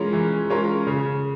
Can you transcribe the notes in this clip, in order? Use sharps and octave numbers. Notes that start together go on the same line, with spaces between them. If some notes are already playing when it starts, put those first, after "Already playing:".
Already playing: E3 G#3 C#4 F4 A#4
E3
G#3 C#4 F4 A#4
C#3